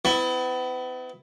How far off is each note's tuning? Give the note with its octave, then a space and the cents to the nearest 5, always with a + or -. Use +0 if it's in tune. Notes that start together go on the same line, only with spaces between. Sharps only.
B3 +45 E4 +0